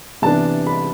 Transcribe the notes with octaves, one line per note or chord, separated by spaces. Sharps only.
C3 E3 B3 D4 A5
B5